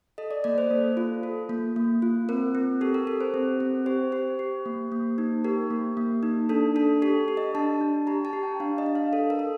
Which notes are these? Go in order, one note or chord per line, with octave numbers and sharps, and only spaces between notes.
A4 D#5
D5
A#3 D5
C5
A#3 A4
F4
A4
A#3
A#3
F4
C4 A#4
C4
G4 A4
A#4
G4 A4
C5
C4
C4
G4 C5
G4 C5
G4
A#3
A#3
D#4
G4 A#4
A#3
A#3
D#4
D4 A4
D4 A4
G4 A4
G4
D#5
D4 A5
D4
G4 A#5
A5
G4
G5
D4 F5
D#5
D4
F5
A4
A#4
A4